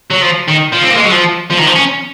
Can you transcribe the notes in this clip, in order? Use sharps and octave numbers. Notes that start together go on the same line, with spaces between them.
F#3
F3
D#3
F3
C4
A#3
G#3
F#3
F3
F3
D#3
F3
C#4